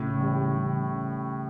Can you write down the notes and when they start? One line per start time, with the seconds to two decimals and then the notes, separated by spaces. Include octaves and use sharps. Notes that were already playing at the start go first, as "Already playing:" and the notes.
Already playing: A2 C#3
0.19 E3 G3
0.55 C#3